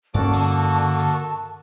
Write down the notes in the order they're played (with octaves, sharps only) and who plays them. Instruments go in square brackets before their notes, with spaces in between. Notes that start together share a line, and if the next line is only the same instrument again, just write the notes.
[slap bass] G2 C#4 [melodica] A#3 F#4 A4 [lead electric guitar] D5 [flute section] A5 C#6
[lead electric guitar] D3